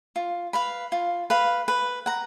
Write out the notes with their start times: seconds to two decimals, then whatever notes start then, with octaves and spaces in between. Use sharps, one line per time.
0.16 F4
0.53 B4 F5 B5
0.92 F4
1.30 B4 F5 B5
1.68 B4
2.06 F#5 A#5